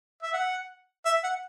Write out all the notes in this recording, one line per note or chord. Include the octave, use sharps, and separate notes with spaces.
E5
F#5
E5
F#5